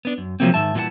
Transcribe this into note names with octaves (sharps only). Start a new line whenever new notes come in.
B3 D4
F#2
C3 F3 F#3 A3 A#3 C4
G#2 D#3 E5 A5
A#2 E3 G3 E4 F#5 A5